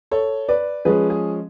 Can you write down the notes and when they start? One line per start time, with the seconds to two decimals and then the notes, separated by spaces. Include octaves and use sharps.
0.11 A4 C#5
0.49 B4 D5
0.85 F3 G#3 C#4 G#4 B4
1.10 G#4